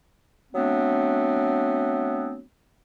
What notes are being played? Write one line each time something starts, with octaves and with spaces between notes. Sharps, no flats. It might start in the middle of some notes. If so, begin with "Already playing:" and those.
F#3 A3 B3 C4 D4